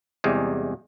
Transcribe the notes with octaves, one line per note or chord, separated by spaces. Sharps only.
E2 C3 G3 G#3